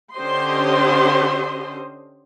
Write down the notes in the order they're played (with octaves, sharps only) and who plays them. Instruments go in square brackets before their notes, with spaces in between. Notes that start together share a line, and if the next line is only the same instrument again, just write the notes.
[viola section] D3 C#4 G4 C5 D#5 C6